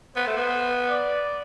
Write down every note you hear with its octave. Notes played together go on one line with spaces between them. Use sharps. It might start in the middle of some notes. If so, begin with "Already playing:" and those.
B3 C5
A3
B3
D5